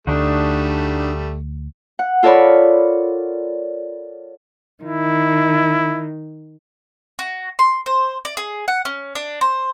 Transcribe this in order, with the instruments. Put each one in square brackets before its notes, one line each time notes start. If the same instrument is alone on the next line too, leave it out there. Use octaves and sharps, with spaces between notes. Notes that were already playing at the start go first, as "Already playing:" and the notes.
[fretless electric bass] D2 [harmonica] G3 A3 [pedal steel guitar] D4 D#4 F#4
[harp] F#5
F4 A4 A#4 C#5 D5 B5
[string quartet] D#3 [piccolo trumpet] E4
[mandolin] F#4
C6
C5
D5
G#4
F#5
C#4
D4
C5